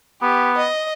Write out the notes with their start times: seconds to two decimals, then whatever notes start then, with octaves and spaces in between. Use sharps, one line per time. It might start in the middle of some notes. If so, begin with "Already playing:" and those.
0.22 B3 G4
0.57 D#5